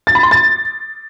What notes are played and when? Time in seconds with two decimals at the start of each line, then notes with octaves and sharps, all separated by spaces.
0.07 A6
0.15 B5
0.23 C6
0.31 A6